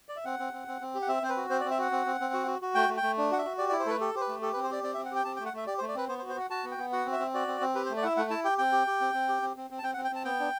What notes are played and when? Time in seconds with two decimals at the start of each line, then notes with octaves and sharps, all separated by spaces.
0.09 D5
0.16 E5
0.25 C4 F#5
0.39 C4
0.53 C4
0.68 C4
0.81 C4
0.95 G4
1.02 F#5
1.08 C4 E5
1.23 C4 C5
1.29 B4
1.37 F#4
1.50 C4 C5
1.60 D5
1.65 C4
1.71 E5
1.78 F#4 F#5
1.92 C4
2.06 C4
2.20 C4
2.34 F#4
2.47 F#4
2.62 F#4
2.75 A3 G5
2.89 A3
2.97 G5
3.03 A3
3.18 D4
3.31 F#4 F#5
3.38 E5
3.45 F#4
3.58 G4 D5
3.69 D5
3.72 E4
3.79 C5
3.86 A3 A4
3.90 B4
4.00 G4 A4
4.15 G4 C5
4.21 B4
4.28 A3
4.42 G4 A4
4.53 B4
4.56 C4
4.63 C5
4.70 G4 D5
4.83 C4 D5
4.94 E5
4.97 C4
5.05 F#5
5.12 G4 G5
5.25 C4 A5
5.36 G5
5.40 A3
5.46 F#5
5.53 A3 E5
5.67 G4 D5
5.78 C5
5.82 A3
5.88 D5
5.95 C4 B4
6.08 B3 C5
6.19 C5
6.23 F#4
6.29 C5
6.36 F#4 F#5
6.50 F#4 A5
6.64 B3
6.71 G5
6.78 B3
6.93 F#4 F#5
7.06 C4
7.12 E5
7.19 C4
7.34 F#4 D5
7.48 C4
7.61 C4
7.75 G4 B4
7.86 C5
7.90 A3
7.97 D5
8.03 E4 E5 F#5
8.17 A3 F#5
8.30 E4 A5
8.44 G4 G5
8.58 C4 G5
8.72 G4
8.87 G4
9.01 C4
9.14 C4
9.29 G4
9.42 C4
9.57 C4
9.70 C4
9.79 A5
9.83 C4 G5
9.94 F#5
9.97 C4
10.04 G5
10.11 C4 A5
10.25 B3 G5
10.40 D4